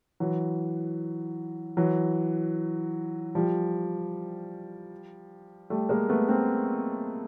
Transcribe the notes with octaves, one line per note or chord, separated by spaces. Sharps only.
E3 F#3
E3 F#3
F3 G3
G3 A3
G#3 A#3
A3 B3
A#3 C4